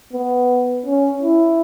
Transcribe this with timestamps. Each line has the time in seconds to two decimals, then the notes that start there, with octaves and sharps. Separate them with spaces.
0.13 B3
0.86 C#4
1.22 E4